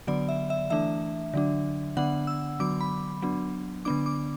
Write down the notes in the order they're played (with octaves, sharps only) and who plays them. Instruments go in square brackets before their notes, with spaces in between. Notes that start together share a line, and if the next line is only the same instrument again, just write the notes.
[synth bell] D3 F#3 B3 D5
E5
E5
E3 A3 D4 E5
D3 F#3 D4
D3 B3 D4 F#5
E6
D3 F#3 B3 D6
B5
F#3 B3 D4
D3 B3 D4 D6
D6